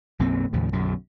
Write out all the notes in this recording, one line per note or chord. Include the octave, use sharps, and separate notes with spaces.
B1 F#2 A#3 C4
D#2 A2 C#3 F3
B1 F#2 B2 D3